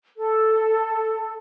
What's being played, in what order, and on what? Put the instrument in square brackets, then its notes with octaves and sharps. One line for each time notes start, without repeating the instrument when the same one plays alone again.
[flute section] A4